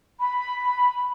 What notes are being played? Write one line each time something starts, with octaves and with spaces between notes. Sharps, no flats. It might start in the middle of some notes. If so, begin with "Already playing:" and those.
B5